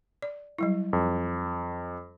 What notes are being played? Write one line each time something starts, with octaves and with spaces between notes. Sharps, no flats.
D5
F#3 G3 E4
F2